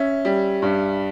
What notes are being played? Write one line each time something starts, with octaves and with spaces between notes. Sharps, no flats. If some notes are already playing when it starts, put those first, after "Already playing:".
Already playing: C#4 E5
G3
G2